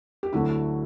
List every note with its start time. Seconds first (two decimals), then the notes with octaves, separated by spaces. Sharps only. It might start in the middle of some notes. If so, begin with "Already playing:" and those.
0.23 G4
0.33 D2 D3 F#3 A3 E4 F#4